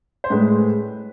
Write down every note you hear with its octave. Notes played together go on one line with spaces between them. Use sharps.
C5
A2 G#3 B4